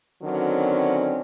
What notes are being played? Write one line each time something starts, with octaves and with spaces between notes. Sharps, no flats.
D3 D#3 F#3 C4 C#4